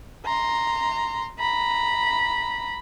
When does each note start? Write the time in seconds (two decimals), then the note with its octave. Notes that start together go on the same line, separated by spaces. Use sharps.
0.25 A#5 C6
1.39 A#5 B5